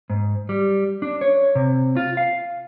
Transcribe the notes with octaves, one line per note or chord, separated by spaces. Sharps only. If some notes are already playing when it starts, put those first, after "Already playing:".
G#2
G3
D4
C#5
C3
F4
F5